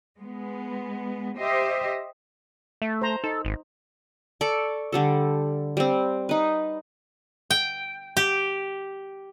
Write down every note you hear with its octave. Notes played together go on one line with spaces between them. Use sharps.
G#3 B3
G4 C5 D#5 E5
A3 E5
C5 A#5
D#4 A4
G#1
A4 D5 C#6 D6
D3 G3 A4
G3 C4
D#4 B4
G5
G4